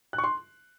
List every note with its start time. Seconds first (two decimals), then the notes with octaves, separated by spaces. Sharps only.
0.13 F#6
0.18 C#6
0.24 C6